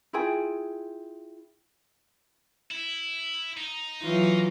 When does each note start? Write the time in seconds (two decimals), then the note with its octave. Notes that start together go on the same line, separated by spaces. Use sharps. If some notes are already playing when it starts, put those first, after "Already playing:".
0.13 E4 F4 G#4 G5
2.71 E4
3.57 D#4
4.02 E3 F#3 F4